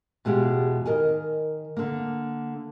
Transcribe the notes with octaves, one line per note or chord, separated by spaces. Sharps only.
E2 B2 G#3 F4 G4
D#3 A#4 D#5 G#5
D3 A#3